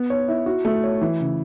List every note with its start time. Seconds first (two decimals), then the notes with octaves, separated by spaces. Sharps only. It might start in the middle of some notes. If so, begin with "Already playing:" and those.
Already playing: B3
0.10 C#5
0.28 E4
0.46 F#4
0.65 A3
0.84 C#5
1.01 E3
1.20 C#3